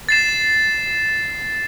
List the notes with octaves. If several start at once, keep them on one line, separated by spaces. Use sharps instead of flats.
A6 C7 E7